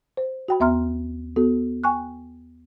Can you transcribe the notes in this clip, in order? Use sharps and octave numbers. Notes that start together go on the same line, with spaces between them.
C5
F#4 G5 B5
D#2 B3 E5 A#5 C6 F6
B3 F#4 A4
G5 G#5 C#6 F#6